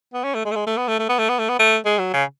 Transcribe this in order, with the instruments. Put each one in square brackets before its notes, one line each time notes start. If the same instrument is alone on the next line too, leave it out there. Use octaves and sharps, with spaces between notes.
[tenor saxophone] B3
C#4
A3
G#3
A3
G#3
A3
B3
A3
A3
B3
A3
B3
A3
B3
A3
G#3
F#3
C#3